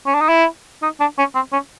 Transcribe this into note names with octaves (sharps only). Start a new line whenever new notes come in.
C#4
D4
D#4
E4
D#4
D4
C#4
C4
C#4